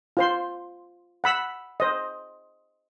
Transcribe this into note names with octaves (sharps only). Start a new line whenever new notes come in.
F4 C5 C6
F#5 B5 E6
C5 D#5